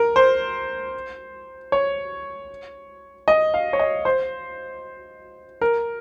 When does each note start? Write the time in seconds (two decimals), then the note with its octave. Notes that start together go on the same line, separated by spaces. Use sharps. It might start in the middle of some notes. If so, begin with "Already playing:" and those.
Already playing: A#4
0.16 C5
1.72 C#5
3.28 D#5
3.54 F5
3.73 C#5
3.79 D#5
4.05 C5
5.61 A#4